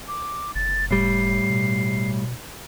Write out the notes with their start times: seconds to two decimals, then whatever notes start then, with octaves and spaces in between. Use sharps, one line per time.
0.08 D6
0.55 F#1 A6
0.91 F#1 A2 G3 C7
1.50 B2